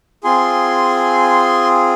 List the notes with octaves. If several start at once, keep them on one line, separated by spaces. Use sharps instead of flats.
C4 F4 G#4 G#5 C6